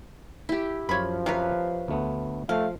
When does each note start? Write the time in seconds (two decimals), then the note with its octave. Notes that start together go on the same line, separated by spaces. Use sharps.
0.49 E4 G4
0.89 F#2 F3 F4 C#5 B5
1.26 C3 A#3 B4 C#5 F5
1.88 D2 A3 B3
2.49 F3 A3 F5